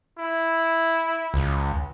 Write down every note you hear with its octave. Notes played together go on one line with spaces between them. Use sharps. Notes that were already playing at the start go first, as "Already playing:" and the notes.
E4
C#2